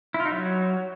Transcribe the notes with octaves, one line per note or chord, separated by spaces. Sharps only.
E4
F4
D#4
F#3